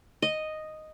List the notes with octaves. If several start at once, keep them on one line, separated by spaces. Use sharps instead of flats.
D#5